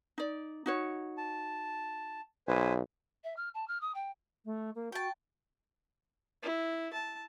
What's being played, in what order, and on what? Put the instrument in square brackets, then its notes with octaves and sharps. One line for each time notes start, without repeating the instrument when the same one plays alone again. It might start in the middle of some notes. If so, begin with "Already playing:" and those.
[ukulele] D#4 D5
D#4 F#4 C#5
[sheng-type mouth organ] A5
[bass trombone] B1 [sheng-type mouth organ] B4 C5 G#5
[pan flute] E5
F6
A5
F6
D#6
G5
[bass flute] A3
A#3
[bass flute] F#4 [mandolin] G5 A5
[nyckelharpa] E4
A5